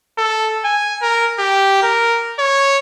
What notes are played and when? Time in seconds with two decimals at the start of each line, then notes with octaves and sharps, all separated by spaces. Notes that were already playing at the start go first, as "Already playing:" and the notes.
0.18 A4
0.65 G#5
1.02 A#4
1.39 G4
1.83 A#4
2.39 C#5